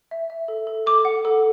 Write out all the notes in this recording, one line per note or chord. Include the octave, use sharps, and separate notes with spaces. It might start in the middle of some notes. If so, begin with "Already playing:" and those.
E5
E5
A4
A4
A4 D6
F#5
A4